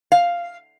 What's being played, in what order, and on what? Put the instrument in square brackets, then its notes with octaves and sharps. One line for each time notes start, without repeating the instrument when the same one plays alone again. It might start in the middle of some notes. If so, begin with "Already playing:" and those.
[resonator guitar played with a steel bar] F5